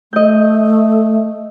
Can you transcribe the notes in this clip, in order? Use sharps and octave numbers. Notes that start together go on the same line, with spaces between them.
A3 D#5 G6